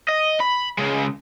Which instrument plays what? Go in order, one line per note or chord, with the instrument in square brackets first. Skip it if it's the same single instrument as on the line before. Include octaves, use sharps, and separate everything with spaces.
[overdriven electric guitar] D#5
B5
C#3 G#3